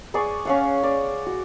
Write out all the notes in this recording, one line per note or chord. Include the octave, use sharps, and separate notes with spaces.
B3 G#4 D5 C#6
C#4 F5 F#5
D5
F#4